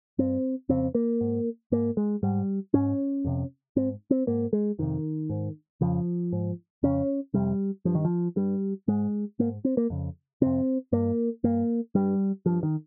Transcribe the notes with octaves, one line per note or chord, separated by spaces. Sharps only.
G2 C4
F2 C#3 C4
A#3
G#2
G#2 A#3
G#3
G#2 G3
G#2 C#4
F2 C3
G#2 C4
C4
G#2 A#3
G#3
F2 C3 D#3
G#2
F2 C#3 F3
G#2
F2 C#3 C#4
F2 C3 G3
G2 F3
D#3
F3
G2 G3
G#2 G#3
G#2 A#3
C4
A#3
F2 C#3
F2 C3 C4
G2 A#3
G2 A#3
G2 G3
G2 F3
D#3